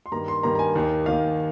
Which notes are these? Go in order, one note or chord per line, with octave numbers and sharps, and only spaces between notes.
C6
G2 D#3 A#3 A#5
C6
G2 D#3 A#3 A#5
A#5
G#5
D#2 D#3 A#3
D#2 D#3 A#3 F5